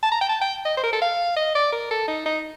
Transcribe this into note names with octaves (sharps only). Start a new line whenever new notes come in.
A5
A#5
G5
A5
G5
D#5
C5
A#4
A4
F5
D#5
D5
A#4
A4
D#4
D#4